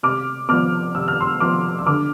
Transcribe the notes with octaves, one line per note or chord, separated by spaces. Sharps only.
C3 D6 F6
F3 B3 D6 F6
C3 E6
F6
C6 E6
F3 B3 D6 F6
E6
D3 D6 F6